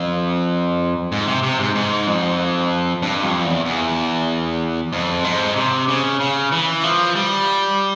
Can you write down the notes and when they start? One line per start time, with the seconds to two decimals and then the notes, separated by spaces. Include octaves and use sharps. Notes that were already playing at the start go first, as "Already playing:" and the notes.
Already playing: F2
1.12 G#2
1.27 C3
1.43 C3
1.59 G#2
1.75 G#2
2.07 F2
3.03 G2
3.23 F2
3.44 E2
3.65 E2
4.93 F2
5.24 G#2
5.56 C3
5.88 C#3
6.20 C#3
6.52 E3
6.84 F3
7.16 G3